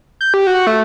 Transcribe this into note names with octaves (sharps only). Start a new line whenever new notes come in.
G6
G4
F#4
A3